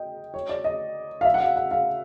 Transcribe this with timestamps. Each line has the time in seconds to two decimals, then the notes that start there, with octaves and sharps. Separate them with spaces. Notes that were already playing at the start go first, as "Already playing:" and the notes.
Already playing: D#5 G5
0.34 C#5
0.49 D5
0.64 D#5
1.21 F5
1.25 E5
1.34 F#5
1.41 F5
1.56 F#5
1.71 F5